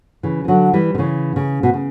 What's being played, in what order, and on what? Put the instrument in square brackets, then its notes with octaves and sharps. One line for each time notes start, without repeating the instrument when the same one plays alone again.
[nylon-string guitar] C#3 E3
E3
D3 F#3
E3 G3
D3
C#3 E3
C#3
B2
C#3